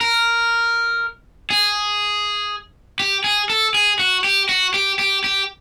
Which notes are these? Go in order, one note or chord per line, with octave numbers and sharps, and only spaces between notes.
A#4
G#4
G4
G#4
A4
G#4
F#4
G4
F#4
G4
G4
G4